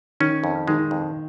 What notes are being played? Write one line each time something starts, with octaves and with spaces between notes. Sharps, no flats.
D#3 C#4
F2
D#3 G#3
F2